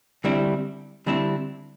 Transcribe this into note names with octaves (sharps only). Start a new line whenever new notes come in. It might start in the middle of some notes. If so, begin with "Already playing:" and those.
D3 G3 C4 E4
D3 G3 C4 E4